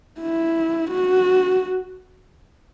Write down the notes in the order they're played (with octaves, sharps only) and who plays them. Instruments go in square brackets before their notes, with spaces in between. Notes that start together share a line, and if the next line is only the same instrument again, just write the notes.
[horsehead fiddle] E4
F#4